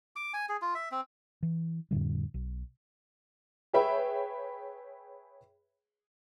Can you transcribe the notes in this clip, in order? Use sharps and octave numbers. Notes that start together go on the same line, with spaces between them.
D6
G#5
G#4
F4
E5
C4
E3
F2 A2 D3 G3
B1
G#4 B4 C#5 E5 G5 B5